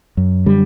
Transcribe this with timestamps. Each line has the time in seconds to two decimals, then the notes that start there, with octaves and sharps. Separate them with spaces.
0.17 F#2
0.46 D3 G3